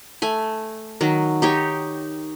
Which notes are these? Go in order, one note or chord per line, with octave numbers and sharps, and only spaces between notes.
A3 G#5
D#3 F#3
D#4 G4 C#5